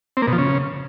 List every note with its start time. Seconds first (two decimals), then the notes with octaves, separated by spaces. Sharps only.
0.17 C4
0.22 A#3
0.28 B2
0.33 F3
0.38 C#3